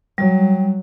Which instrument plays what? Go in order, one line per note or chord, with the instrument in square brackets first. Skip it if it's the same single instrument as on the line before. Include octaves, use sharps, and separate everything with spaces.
[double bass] F#3 [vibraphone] G3